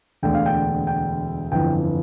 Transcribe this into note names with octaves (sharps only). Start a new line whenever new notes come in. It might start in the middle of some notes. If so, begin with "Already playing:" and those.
E1 D2 D3 G5
F5
G5
G5
G1 F2 E3 G5